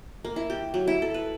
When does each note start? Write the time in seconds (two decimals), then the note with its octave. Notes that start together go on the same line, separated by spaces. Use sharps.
0.25 A#3
0.36 E4
0.50 G4
0.74 F#3
0.87 E4
1.02 A4
1.14 B4